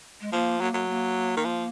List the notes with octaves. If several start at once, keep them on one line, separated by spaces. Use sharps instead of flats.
G#3
F3 A#3
F#3 A#3
F#3
A#3
D#3
F3